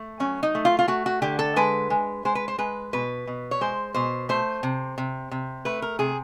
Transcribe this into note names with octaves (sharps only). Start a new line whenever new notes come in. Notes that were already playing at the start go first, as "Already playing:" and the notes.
Already playing: A3
F#3 C#4
D#4
A3
F4
F4
A3 F#4
F#4
D3 G4
A4
G#3 B4
G#3
G#3 C5
B4
C5
G#3 B4
B2 B4
B2
C#5
G#3 C5
B2 C5
A3 C5
C3
C3
C3
A3 B4
A#4
C3 G#4